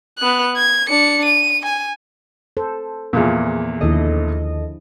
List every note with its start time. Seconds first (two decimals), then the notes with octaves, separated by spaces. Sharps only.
0.18 B3 F#6
0.57 G#6
0.89 D4 C#7
1.25 D#7
1.65 G#5
2.57 A4 C5
3.13 E2 A#2 F3 F4 G#4
3.81 D#2 D3 F3 E4 A4 D#5